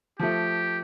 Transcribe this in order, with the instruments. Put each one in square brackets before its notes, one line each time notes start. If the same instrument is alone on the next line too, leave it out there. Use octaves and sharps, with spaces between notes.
[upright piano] F3 A3 [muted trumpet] G4